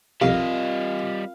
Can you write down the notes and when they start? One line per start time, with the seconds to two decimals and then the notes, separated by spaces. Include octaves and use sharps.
0.21 C2 F2 G3 C4 F4 A#4 D#5 F5